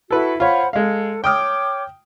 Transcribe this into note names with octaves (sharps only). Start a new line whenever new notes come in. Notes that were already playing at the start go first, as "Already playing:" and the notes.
E4 F#4 A4 B4
F4 C5 C#5 F#5 B5
G#3 A4 F5
C#5 G5 D6 D#6 F6